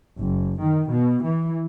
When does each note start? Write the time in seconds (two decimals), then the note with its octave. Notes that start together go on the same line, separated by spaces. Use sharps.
0.20 F#1
0.61 D#3
0.91 B2
1.24 E3